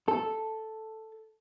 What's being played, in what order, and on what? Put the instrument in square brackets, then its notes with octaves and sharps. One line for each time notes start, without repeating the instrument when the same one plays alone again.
[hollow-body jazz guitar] A4